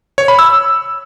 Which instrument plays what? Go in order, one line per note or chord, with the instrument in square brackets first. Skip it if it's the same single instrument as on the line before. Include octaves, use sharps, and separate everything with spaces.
[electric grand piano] C#5
B5
E6